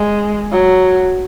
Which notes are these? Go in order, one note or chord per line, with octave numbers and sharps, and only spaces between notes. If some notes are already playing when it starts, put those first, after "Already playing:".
Already playing: G#3
F#3